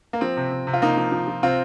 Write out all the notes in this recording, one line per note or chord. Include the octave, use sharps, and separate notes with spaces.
A#3
F3 C4
C3
C3
C3
F4
C3 A#3 D#4
F3
F3
F3
C3 C4 F4